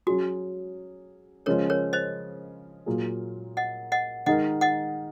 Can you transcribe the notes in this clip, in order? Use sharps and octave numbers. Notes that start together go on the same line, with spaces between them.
F#3 C#4 F#4 G#4
C#3 F3 G#3 C#4 F4 A#4 C#5
A#4 C#5
C5 D#5
A#2 F#3 A#3 F4 G#4
D#5 F#5
D#5 F#5
D#3 G#3 D#4 A#4 D#5 F#5
D#5 F#5